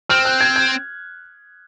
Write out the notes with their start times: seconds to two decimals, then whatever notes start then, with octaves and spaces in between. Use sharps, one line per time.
0.09 C4 F6
0.25 F#6
0.41 G#6
0.56 G#6